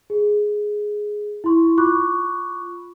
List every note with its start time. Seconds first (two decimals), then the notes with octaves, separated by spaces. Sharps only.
0.10 G#4
1.44 E4 C6 C#6
1.78 F4 B5 C#6 D6 F#6